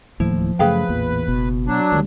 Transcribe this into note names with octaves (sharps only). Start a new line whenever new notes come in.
D1 D#2 A2 F3 E4
F#2 C#3 A3 G#4 B4 F5 G5
A1 E2 A#2
F#1 B2
F#3 D4
D2 D#3 G3